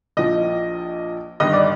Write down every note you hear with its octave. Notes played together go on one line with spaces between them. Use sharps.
A#1 A#2 F3 D#5
G1 G2 D#3 D#5
D5